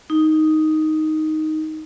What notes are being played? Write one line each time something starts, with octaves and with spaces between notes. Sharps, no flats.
D#4